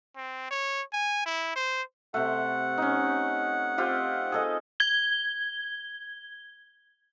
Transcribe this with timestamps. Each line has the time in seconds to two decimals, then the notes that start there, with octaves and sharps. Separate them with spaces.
0.16 C4
0.51 C#5
0.93 G#5
1.26 E4
1.56 C5
2.14 C3 A3 F#5
2.78 C#4 D#4
3.78 C4 F4 G4
4.32 G#4 A4 D#5
4.80 G#6 G7